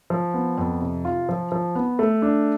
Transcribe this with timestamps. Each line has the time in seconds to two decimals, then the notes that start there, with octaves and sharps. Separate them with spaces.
0.10 F3
0.34 B3
0.58 F2
0.81 C3
1.05 F4
1.29 F3
1.52 F3
1.75 B3
1.99 A3
2.22 D4